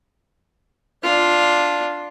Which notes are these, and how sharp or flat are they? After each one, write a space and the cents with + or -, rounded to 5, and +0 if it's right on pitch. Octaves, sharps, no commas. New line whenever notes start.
D4 +0 F4 +5